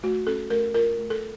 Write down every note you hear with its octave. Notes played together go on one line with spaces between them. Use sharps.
A3 F#4
C#4 A4
A3 A#4
F4 A#4
A3
A4